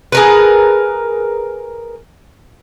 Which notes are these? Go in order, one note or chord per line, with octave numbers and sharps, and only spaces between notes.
G#4 A#4 B4